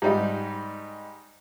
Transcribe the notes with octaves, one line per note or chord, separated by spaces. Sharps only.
G#2 G3 D#4